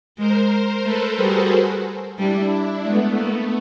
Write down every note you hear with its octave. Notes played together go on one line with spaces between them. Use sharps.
G#3 A#4 C5
A3 A4 B4
G3 F#4 G#4
G3 D4 E4
G#3 A3 B3
A#3